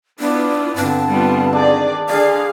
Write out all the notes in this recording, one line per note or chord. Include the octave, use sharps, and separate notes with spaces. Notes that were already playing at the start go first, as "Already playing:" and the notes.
B3 D4 E4 F4
G2 D3 C4 A5
G3 B3 F4
D#3 D4 G#4 D5
D3 G#4 D5 F5